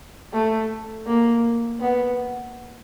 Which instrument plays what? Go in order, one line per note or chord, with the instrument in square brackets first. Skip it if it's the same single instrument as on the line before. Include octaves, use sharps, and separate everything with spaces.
[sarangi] A3
A#3
B3